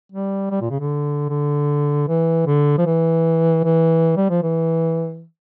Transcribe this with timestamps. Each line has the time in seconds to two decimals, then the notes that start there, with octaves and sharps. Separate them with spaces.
0.12 G3
0.51 G3
0.61 A#2
0.70 C#3
0.80 D3
1.30 D3
2.08 E3
2.47 D3
2.78 F3
2.86 E3
3.64 E3
4.17 G3
4.30 F3
4.43 E3